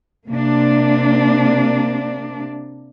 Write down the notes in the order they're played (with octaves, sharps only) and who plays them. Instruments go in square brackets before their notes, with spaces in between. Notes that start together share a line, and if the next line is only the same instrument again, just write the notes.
[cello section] C3 A#3 D4